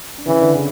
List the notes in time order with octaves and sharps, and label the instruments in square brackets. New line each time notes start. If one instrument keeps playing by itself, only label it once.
[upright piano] D4
[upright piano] C#3 C#4 [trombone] E3
[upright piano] D3 D4
C#3 C#4